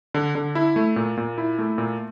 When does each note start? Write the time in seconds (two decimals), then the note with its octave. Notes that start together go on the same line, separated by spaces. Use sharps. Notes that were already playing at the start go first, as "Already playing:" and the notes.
0.14 D3
0.35 D3
0.55 E4
0.76 A3
0.96 A#2
1.17 A#2
1.38 E4
1.59 A3
1.78 A#2